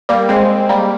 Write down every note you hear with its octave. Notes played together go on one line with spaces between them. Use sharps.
G3 A#3
G#3 C4
G3 A#3